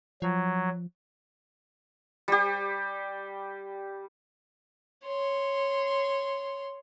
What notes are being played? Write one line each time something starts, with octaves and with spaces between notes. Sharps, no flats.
F3 F#3
G3 G4
C#5 C6